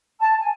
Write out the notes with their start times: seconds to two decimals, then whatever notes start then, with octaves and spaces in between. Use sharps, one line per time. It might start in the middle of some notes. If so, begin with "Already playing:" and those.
0.20 A5
0.39 G#5